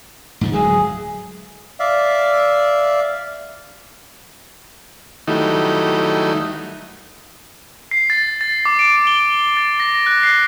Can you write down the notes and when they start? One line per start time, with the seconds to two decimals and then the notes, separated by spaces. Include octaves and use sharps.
0.41 G#2 C#3 F3
0.53 D1 F#3 G#3 G#4
1.80 D5 E5 F5
5.28 D#3 F#3 G3 A3 D#4 E4
7.91 C7
8.10 A6
8.41 A6
8.65 D6
8.79 D7
9.07 G7
9.57 A6
9.80 A#6
10.06 F#6
10.23 C7